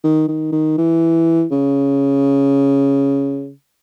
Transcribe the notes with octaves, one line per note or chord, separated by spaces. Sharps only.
D#3
D#3
D#3
E3
C#3